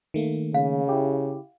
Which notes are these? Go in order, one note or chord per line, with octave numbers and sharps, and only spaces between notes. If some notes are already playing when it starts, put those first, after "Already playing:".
D#3 A3 A#3
C#3 F5
E4 G4